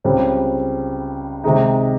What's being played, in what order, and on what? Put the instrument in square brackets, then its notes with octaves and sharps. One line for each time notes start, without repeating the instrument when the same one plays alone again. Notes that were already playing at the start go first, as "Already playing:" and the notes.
[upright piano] C#2 C#3 G3 C4
C3 D#3 G#3 D#4